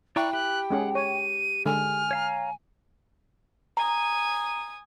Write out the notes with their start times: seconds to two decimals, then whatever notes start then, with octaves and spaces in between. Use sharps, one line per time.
0.16 E4 D5 G5 A#5 C#6 F#6
0.33 G4 B5 F#6
0.70 G#3 C#4 G#4 F#5
0.95 C#5 D#7
1.66 D3 G#3 A4 G#5 F6
2.11 C#5 F5 A#5
3.77 G#5 A#5 D#6